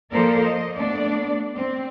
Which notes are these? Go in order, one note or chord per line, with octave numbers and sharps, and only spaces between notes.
F3 A#3 A4 A#4 C5 D5
D#5
A3 B3 D4 D5
C4